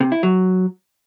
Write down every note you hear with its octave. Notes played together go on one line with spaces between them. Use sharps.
C3
E4
F#3